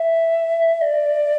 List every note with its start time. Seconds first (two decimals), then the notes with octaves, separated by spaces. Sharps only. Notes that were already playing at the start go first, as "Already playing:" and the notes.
Already playing: E5
0.81 D5